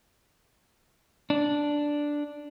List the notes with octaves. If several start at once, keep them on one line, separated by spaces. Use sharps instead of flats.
D4